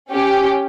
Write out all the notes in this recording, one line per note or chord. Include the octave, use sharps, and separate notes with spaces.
C#4 G4